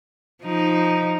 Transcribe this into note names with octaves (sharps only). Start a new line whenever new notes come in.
F3 D#4